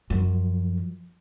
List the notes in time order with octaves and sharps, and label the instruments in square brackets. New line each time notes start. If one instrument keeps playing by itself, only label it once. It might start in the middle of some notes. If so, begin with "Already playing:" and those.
[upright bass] F#2 F3